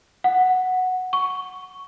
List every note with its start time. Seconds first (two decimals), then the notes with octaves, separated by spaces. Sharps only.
0.24 F#5
1.13 C#6